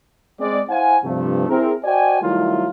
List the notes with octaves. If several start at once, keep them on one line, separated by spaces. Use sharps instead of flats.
G#3 C4 D5
E4 C5 F5 F#5 G#5
G2 C3 F3 A3
C4 E4 G#4 A#4
F#4 C5 D5 D#5 G5 G#5
D#3 F#3 G3 A3 E4 F4